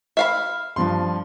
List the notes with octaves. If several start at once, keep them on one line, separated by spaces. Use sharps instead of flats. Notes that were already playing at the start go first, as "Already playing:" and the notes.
E5 F5 B5
G2 F3 C6